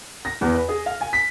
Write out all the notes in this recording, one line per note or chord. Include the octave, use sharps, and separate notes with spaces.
A#6
E2
B4
G#4
F5
G#5
B6